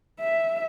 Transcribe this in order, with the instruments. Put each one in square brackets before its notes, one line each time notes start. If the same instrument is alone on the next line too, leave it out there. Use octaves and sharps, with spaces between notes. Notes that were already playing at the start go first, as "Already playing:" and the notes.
[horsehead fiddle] E5